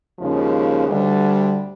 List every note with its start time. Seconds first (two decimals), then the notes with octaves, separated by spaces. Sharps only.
0.18 D#2 C#3 F3 G#3 C#4
0.87 D2 D3 G3